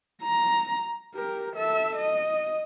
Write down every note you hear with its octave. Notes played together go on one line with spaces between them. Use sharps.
A#5
G4 A#4
A4 E5
D#5